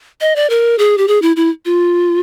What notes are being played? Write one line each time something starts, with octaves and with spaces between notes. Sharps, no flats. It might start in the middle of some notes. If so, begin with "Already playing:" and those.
D#5
D5
A#4
G#4
G4
G#4
E4
E4
F4